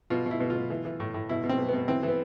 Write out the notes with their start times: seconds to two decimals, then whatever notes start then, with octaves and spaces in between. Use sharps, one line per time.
0.10 B2 F4
0.26 B2 E4
0.40 B2
0.50 F4
0.56 B2
0.70 E3
0.85 E3
1.00 A2
1.14 A2
1.29 B2 E4
1.44 B2
1.49 C4
1.58 B2
1.69 B2 B3
1.88 E3 C4
2.03 E3
2.08 B3